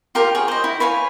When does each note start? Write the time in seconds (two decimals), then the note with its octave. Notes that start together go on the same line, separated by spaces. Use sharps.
0.15 F4 G4 A#4
0.35 G#4 C#5 F#5
0.48 C5 D#5
0.64 E4
0.80 B4 C#5 F5 G#5